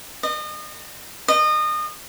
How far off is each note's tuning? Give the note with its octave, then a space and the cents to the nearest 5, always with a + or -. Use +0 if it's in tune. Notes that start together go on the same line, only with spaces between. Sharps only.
D#5 -35
D#5 -30